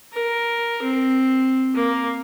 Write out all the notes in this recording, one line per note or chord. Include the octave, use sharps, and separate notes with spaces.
A#4
C4
A#3